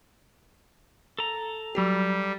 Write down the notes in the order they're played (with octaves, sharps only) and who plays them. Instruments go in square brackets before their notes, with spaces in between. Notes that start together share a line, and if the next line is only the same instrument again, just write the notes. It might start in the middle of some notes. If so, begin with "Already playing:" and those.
[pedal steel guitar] A4 A#5
[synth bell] F#3 F#4 G4 [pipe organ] G3